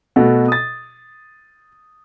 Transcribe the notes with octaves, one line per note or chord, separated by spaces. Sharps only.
B2 A3 F#4 A4
D#6 A6